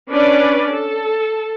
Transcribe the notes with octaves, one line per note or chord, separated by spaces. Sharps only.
C#4 D4 B4 D5
A4